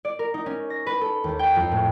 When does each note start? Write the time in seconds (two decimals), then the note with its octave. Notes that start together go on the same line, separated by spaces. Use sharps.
0.05 D5
0.19 A#4
0.34 D#4
0.46 C#4
0.70 A#6
0.87 B4
1.01 A4
1.24 D#2
1.39 G5
1.56 F2
1.72 A2